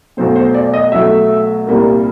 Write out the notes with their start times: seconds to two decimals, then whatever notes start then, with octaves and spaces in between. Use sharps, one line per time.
0.17 B1 B2 F#3 A3 C5
0.36 C5
0.54 D5
0.74 D#5
0.92 B1 B2 F#3 A3 E5
1.67 C2 A#2 G3 A#3